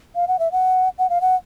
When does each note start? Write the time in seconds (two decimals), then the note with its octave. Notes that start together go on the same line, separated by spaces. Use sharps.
0.15 F5
0.28 F#5
0.39 E5
0.52 F#5
0.98 F#5
1.10 F5
1.21 F#5